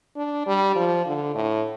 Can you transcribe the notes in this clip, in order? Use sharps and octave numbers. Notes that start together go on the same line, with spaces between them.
D4
G3
F3
D3
A2